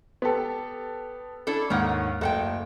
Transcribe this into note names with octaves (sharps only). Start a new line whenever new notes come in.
B3 G4 A4
D4 E4 A4
D#2 G#2 D#4 A#4 C#5 F#5
F#1 A3 F#5 G5